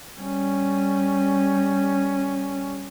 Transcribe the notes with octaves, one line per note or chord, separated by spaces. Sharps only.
G3 C#4